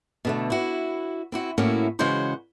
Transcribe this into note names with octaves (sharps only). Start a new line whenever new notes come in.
B2 D3 A3
E4 F#4
C4 E4 F#4
A2 A#3 C#4 E4 F#4
C#3 E3 G#3 F#4 C5 C#5